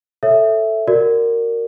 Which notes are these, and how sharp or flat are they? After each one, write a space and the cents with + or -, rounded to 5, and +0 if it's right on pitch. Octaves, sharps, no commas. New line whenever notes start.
A4 +0 C#5 -5 E5 +0
F#4 +0 A#4 -10 D5 +0